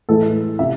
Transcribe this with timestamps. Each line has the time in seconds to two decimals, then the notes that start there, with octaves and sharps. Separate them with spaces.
0.09 A2 E3 G#3 A4
0.59 C3 E5